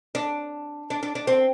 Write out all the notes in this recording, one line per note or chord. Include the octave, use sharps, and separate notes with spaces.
D4
D4
D4
D4
C4